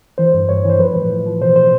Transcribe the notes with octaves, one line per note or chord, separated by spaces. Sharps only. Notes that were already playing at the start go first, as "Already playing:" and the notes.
E3 C5
G2
G2 C#5
E3 C5
F3 B4
A2
A2
F3
B2 C5
C5